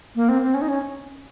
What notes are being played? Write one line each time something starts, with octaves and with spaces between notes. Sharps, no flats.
A#3
C4
C4
C#4
D#4
C#4